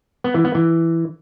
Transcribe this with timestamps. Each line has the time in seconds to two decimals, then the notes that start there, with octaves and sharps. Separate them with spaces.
0.24 B3
0.34 E3
0.45 B3
0.55 E3